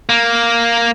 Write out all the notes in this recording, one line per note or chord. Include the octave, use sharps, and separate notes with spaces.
A#3